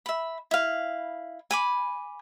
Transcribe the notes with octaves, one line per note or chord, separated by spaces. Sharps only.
E5 B5
E4 F5
G#5 B5 D6